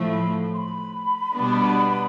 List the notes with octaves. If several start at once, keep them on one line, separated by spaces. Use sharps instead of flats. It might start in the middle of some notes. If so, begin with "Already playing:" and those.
Already playing: A2 F3 A3
B5
C6
B5
B2 G3 B3 D4